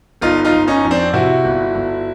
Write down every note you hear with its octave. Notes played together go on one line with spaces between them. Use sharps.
G1 D#4 F4
D#4 F4
G1
C#4 D#4
F2
C4 D4
C3 E4 F#4
G1
G1